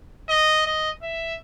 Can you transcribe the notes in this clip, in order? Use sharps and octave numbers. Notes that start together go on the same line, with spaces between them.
D#5
D#5
E5